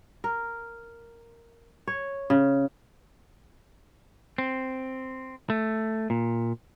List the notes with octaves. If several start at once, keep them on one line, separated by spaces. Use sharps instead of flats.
A#4
C#5
C#3
C4
A3
A#2